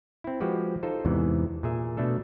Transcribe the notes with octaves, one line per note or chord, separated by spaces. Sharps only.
C4 E4
F3 G#3 F#4 G4 B4
D#4 F4 A4 C5
E2 G#2 C3 E3
A#2 G#4 E5
B2 A3 D4 A4